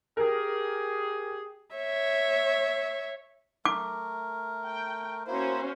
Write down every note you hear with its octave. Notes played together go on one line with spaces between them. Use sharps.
G4 G#4 A#4
C#5 E5
A3 A#4 D6
G5
A#3 C#4 E4 F#4 C5